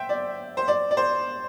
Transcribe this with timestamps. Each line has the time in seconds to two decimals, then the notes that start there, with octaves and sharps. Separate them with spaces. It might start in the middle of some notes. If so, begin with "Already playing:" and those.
Already playing: C5 E5 G5
0.09 D5
0.57 C5
0.68 D5
0.91 D5
0.97 C5